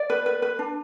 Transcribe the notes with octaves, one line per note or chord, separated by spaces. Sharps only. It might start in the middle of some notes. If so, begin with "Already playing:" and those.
Already playing: D5
B4
B4
B4
D4